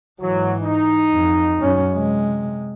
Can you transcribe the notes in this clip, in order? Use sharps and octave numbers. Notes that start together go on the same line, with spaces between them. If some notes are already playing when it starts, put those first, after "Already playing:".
G#2 E3 F#3
D#4
F2
F#2 C#4
C3 G#3